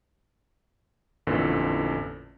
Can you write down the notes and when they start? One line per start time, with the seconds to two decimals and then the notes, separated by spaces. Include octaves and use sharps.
1.27 A1 F2 A#2 D3 E3 A4